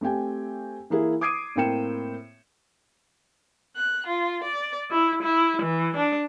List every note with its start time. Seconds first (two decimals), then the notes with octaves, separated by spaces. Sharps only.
0.01 A3 C4 G4 G5 G#5
0.90 E3 A#3 E4 G#4
1.21 D6 D#6 G#6 C7 D7 D#7
1.56 A2 A#3 C4 G5 C#7 E7
3.76 F#6
4.06 F4
4.44 D5
4.91 E4
5.23 E4
5.63 E3
5.96 D4